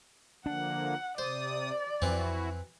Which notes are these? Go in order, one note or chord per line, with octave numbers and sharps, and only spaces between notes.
D3 F3 A#3 D4 F#5
C3 C5 D5 D#6
F2 E3 C4 E4 F#4